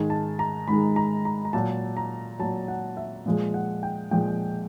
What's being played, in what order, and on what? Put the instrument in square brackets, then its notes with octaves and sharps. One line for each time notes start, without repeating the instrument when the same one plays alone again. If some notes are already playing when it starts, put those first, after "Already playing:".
Already playing: [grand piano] G#2 D#3 G#3 G#5
A5
A#5
G#2 D#3 G#3 B5
A#5
A#5
A#5
A#2 F#3 A5
A#5
A#2 F#3 A5
F#5
E5
A#2 F3 G#3
F#5
G5
A#2 F3 G#3 G5